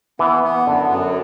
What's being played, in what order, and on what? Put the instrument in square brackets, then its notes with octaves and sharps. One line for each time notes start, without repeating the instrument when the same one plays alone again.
[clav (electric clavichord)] E3 [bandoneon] B3
[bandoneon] B3
[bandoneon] F#2 [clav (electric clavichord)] D3
[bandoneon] F#2